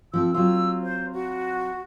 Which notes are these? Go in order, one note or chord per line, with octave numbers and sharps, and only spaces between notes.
F3 C4 A4 E6
F#3 C4 F4 E6
C5
F#4